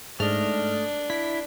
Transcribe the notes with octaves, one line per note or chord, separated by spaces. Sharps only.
G#2 A3 D4 D#5 F6
E4 B6